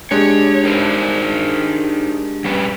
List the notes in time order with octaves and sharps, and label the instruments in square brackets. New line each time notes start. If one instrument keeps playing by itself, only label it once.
[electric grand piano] G#3 D4 G4 [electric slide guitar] C#5
[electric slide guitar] D#4 A#4 C5
G3 C#4 B4